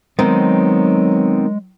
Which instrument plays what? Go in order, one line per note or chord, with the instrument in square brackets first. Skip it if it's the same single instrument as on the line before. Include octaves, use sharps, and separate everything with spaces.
[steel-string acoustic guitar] D#3 [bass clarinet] F#3 [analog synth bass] G#3 [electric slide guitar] B3 C4